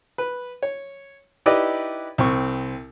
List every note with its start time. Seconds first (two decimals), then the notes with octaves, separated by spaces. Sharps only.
0.18 B4
0.63 C#5
1.46 D#4 E4 G4 B4 D5 D#5
2.18 C2 C4 C#6